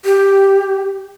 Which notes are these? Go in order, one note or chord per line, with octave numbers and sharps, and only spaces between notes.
G4